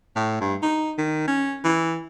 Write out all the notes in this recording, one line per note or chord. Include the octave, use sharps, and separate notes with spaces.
A2
G2
D#4
D#3
C#4
E3